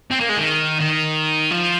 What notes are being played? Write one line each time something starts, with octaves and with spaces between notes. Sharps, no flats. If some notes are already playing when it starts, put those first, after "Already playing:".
C4
A#3
G#3
D#3
D#3
F3